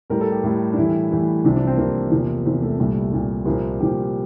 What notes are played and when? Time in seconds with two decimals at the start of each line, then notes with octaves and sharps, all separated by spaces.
0.10 A2 G3 A#4
0.21 A4
0.32 G4
0.43 A2 G3
0.73 D4
0.77 A2 E3 G3 E4
1.11 A2 E3 G3
1.44 C2 C3 F3 D4
1.56 D4
1.67 C4
1.77 C2 C3 F3 A#3
2.11 E2 C3 F3
2.45 E2 C3 F3
2.62 A3
2.79 C2 A#2 G3
3.12 C2 A#2 G3
3.45 C2 A#2 F3 A#3
3.80 C2 A#2 F3 G4